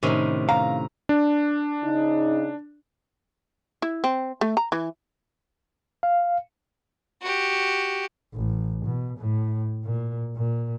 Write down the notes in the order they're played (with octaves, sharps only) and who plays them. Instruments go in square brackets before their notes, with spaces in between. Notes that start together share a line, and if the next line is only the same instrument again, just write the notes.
[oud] A2 D#4 [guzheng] C3 D#3 C#4
[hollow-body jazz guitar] F5 [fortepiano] A#5
[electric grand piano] D4
[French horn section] C#3 D#4
[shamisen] E4
C4
A3
A#5
E3
[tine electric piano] F5
[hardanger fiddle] F#4 G4
[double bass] A1
B2
A2
A#2
A#2